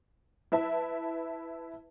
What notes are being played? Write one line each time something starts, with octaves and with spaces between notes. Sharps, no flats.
E4 B4 E5 A5